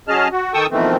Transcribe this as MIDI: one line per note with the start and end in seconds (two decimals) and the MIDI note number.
0.08 0.28 54
0.08 0.28 61
0.08 0.28 68
0.08 0.28 75
0.08 0.28 81
0.08 0.28 89
0.32 0.53 66
0.54 0.66 51
0.54 0.66 69
0.54 0.66 79
0.54 0.66 85
0.54 0.66 87
0.54 0.66 88
0.70 0.96 41
0.70 0.96 47
0.70 0.96 51
0.70 0.96 52
0.70 0.96 57
0.70 0.96 60